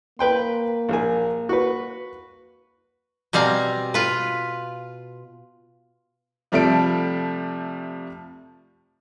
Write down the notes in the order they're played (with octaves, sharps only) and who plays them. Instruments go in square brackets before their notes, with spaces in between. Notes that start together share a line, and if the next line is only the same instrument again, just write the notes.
[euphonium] A#3 [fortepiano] B4 G5 C6
[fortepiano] A#1 A#4 G#5
F#4 B4
[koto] B2 G3 C4 F5 G#5 A#5
F4 B4
[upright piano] C3 F3 G3 A3 A4 D7